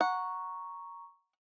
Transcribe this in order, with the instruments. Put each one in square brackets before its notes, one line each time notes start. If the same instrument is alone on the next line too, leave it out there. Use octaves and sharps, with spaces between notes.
[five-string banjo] F#5 [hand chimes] A#5 C#6